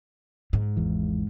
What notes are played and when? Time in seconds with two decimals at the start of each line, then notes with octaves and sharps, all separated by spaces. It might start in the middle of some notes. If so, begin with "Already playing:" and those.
0.53 G#2
0.77 G#1 E2 E3